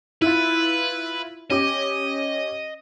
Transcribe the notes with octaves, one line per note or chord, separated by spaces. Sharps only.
E4 F4 B4
C#4 G4 D#5 D6